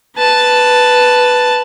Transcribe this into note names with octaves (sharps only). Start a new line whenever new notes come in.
B4 A5